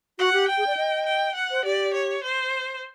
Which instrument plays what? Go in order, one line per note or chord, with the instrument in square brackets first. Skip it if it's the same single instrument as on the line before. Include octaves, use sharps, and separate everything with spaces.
[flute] F#4 [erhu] F#5
[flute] G4
[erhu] G5
[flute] G#4
D5
D#5
[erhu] G5
F#5
[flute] C5
[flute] G4 [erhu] D5
[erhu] C#5
C5